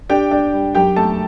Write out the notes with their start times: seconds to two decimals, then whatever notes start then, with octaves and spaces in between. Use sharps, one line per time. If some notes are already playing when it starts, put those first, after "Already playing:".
0.09 D4 G4 G5
0.31 D4
0.53 G3
0.75 F#2 G4 G5
0.96 A3 A4 A5